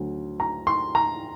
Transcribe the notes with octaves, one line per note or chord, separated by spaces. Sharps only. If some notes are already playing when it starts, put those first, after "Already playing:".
Already playing: D2 D3 F#3
A#5
C6
A#5